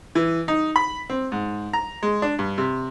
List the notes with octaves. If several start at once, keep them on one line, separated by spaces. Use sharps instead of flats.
E3
D#4
B5
C4
G#2
A#5
G#3
D4
G2
C3